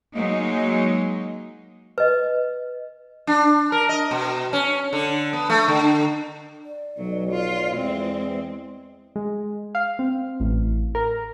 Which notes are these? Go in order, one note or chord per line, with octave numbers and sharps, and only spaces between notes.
F#3 G#3 A#3 D#4
B4 D#5
D4
A#4
D#5
B2
C#4
D3
B3
A3
D3
D5
B1 F#3
F4
E2 G#3 C4
G#3
F5
C4
A1
A#4